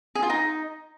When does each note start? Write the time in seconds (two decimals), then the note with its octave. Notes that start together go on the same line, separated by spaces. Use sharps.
0.15 G#4
0.23 F4
0.30 D#4